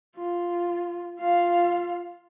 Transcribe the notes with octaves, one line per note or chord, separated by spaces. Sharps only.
F4
F4 F5